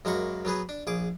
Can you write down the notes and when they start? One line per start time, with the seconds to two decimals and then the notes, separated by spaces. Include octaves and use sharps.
0.05 F#2 G#3 A#3 F#4 B5 C#6
0.45 F#3 B3 G#4 B4
0.69 D4
0.87 A#1 G#4 D6